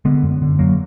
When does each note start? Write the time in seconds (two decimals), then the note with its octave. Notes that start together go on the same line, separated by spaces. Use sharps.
0.05 D3 G#3 B3
0.23 F#2
0.42 D3
0.59 F#2 F#3 A#3